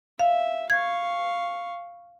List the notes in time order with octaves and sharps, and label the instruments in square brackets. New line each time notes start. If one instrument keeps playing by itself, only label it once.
[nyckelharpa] E5 [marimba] F5
[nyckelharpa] F5 C#6 [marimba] G#6